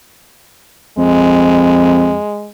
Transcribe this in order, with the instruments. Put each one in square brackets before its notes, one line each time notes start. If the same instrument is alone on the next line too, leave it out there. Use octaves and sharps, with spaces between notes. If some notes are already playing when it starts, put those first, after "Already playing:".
[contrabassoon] F2 [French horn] G#3